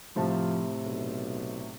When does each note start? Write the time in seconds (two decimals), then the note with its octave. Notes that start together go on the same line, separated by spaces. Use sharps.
0.16 A2 C3 F3 A5
0.85 B1